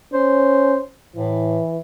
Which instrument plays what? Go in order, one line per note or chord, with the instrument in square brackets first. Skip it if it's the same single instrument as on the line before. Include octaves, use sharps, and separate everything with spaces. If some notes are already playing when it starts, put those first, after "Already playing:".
[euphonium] C#4 [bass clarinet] C5
[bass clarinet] A2 [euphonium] E3